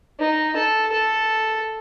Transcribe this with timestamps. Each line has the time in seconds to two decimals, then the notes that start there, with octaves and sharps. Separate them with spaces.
0.19 D#4
0.56 A4
0.92 A4